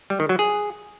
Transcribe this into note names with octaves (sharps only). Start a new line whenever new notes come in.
G3
D#3
F#3
G#4